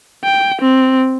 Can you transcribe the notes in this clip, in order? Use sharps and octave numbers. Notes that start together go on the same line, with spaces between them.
G5
C4